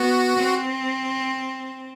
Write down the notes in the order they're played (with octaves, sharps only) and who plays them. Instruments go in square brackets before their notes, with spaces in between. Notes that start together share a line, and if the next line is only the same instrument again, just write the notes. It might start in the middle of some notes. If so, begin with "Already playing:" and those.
Already playing: [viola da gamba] B3 [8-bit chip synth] F#4
[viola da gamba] C4